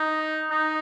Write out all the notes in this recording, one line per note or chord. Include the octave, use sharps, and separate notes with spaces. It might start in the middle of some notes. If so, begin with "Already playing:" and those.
Already playing: D#4
D#4